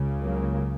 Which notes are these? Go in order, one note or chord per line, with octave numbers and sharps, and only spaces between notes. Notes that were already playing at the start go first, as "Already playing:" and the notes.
Already playing: C#2 C#3
F#3 A#3